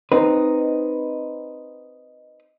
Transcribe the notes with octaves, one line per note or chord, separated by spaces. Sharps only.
C4 D#4 B4